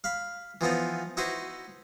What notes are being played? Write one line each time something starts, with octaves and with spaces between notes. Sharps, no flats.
F5 B5
E3 F3 B3 D#4
D#4 E4 F#4 B4 C5